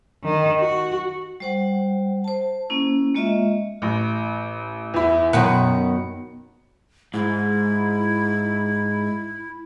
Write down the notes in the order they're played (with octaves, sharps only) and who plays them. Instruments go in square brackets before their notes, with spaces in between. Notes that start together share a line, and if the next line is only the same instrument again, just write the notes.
[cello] D#3
F#4
[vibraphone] G3 C5 F#5
C5 A5
A#3 C#4 E4
G#3 A#3 F4 D#5 E5
[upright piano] A1
E2 E4
[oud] F#2 B2 D#3 [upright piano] F#5
[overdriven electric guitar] G#2 [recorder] E4